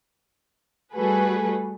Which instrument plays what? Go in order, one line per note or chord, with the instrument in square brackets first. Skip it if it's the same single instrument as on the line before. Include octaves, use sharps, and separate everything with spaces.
[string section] G3 A3 F#4 G#4 A4 B4